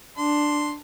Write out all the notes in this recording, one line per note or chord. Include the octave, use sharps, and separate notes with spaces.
D4 C6